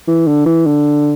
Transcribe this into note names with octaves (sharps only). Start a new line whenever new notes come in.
E3
D3
E3
D3